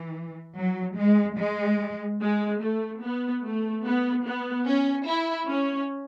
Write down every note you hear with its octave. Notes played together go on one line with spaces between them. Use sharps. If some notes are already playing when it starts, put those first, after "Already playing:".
Already playing: E3
F#3
G#3
G#3
G#3
A3
B3
A3
B3
B3
C#4
E4
C#4